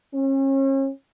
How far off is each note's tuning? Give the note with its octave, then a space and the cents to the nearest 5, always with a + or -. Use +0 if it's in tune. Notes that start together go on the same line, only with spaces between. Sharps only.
C#4 -40